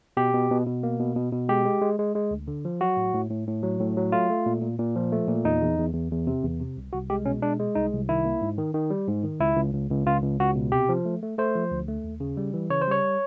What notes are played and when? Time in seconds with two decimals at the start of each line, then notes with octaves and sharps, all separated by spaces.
0.17 B2 G4
0.33 B2
0.51 B2
0.66 B2
0.83 A#3
1.00 B2
1.16 B2
1.32 B2
1.49 G#3 G4
1.65 G#3
1.82 G#3
1.99 G#3
2.15 G#3
2.31 D2
2.48 D3
2.65 F3
2.81 F#3 F#4
2.97 A2
3.14 A2
3.30 A2
3.47 A2
3.63 F#3
3.80 A2
3.97 F#3
4.12 A3 F4
4.30 A3
4.46 A#2
4.62 A#2
4.78 A#2
4.96 F3
5.12 A3
5.28 A#2
5.44 E2 D#4
5.61 E2
5.78 E2
5.94 E2
6.11 E2
6.27 C3
6.43 E2
6.60 C3
6.77 C2
6.93 C2 F#4
7.10 G#3 G4
7.26 B2 C#4
7.42 G#3 D4
7.60 G#3
7.75 C2 D#4
7.93 C2
8.09 D#3 E4
8.25 A#3
8.41 G#2
8.58 D#3
8.74 D#3
8.90 G3
9.08 G#2
9.23 D#3
9.40 C#2 E4
9.56 C#2
9.74 C#2
9.90 C#2
10.07 C#2 F4
10.22 C#2
10.40 C#2 F#4
10.55 B2
10.72 C3 G4
10.89 F3
11.05 A3
11.22 A3
11.38 A3 C5
11.55 F3
11.71 D2
11.88 A3
12.04 D#2
12.20 C#3
12.37 G3
12.54 E3
12.70 C#3 C#5
12.82 C5
12.87 G3 C#5